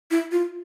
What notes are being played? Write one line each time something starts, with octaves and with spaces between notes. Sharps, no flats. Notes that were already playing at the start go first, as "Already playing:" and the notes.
E4
F4